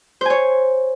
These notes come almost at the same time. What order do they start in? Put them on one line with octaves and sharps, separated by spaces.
C5 G#5 C#5